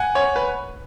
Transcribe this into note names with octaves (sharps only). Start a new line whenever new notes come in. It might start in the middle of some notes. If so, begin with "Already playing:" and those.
Already playing: F#5 G#5
C#5
B4